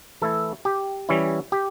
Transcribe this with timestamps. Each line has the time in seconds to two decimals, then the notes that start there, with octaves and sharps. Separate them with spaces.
0.22 E3 A3 E4 A4
0.65 G4
1.09 E3 G3 C#4 E4
1.52 G4